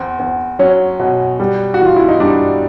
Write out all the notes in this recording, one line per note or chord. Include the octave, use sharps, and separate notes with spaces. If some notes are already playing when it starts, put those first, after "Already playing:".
Already playing: E2 C4
E2
F#3 C#4
B2
G3
F#4
E3
F4
E4
D#4
G3 D4